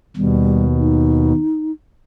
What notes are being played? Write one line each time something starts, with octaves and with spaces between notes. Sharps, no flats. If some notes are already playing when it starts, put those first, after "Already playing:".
D#2 B2 G3
D#4